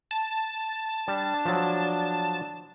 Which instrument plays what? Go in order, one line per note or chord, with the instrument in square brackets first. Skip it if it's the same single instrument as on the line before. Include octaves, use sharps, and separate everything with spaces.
[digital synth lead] A5
[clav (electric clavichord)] G3 [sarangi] D4
[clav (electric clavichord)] F3 F#3